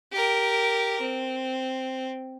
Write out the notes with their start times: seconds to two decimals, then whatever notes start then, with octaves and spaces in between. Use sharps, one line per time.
0.12 G4 A#4
1.01 C4